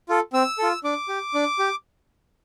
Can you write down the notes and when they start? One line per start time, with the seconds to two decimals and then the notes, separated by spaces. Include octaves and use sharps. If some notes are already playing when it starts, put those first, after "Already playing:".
0.09 F4 A4
0.33 C4 E6
0.58 F4 A4
0.84 D4 D6
1.09 G4
1.34 D4
1.59 G4